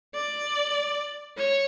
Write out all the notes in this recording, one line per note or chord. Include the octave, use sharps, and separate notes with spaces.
D5
C#5